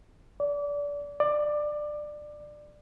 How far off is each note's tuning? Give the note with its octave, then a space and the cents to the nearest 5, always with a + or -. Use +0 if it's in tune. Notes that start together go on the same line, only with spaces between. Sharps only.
D5 -25
D5 +20